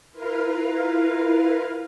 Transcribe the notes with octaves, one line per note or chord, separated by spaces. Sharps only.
E4 F4 A#4 B4 F5